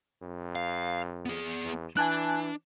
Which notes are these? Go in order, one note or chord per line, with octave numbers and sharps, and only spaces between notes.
F2
F5
B3 G#4
E2
E3 D4 G#5 A5 F#6